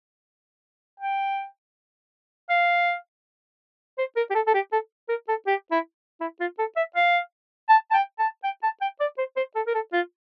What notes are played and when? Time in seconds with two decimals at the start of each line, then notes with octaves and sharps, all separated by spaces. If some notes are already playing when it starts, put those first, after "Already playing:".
1.00 G5
2.50 F5
3.98 C5
4.16 A#4
4.30 G4
4.35 A4
4.47 A4
4.54 G4
4.72 A4
5.09 A#4
5.28 A4
5.47 G4
5.71 E4
6.20 E4
6.40 F4
6.59 A4
6.76 E5
6.96 F5
7.69 A5
7.91 A5
7.94 G5
8.19 A5
8.44 G5
8.63 A5
8.81 G5
9.00 D5
9.18 C5
9.36 C5
9.55 A4
9.67 A#4
9.74 A4
9.93 F4